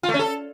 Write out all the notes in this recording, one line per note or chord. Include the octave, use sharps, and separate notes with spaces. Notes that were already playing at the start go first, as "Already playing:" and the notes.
F4
A3
C#4
A4